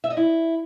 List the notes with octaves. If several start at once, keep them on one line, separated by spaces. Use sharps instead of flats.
E5
D#5
E4